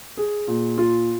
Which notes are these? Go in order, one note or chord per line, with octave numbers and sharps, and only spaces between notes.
G#4
A#2
F4